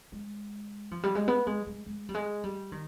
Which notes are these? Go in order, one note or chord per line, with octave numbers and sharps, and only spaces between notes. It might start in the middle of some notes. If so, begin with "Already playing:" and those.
G#3
F3
G3
G#3
B3
G#3
G#3
G#3
G3
G#3
G3
D#3